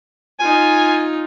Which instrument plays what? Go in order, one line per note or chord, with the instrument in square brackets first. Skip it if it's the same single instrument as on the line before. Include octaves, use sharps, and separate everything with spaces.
[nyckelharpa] D#4 F4 [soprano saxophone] G#5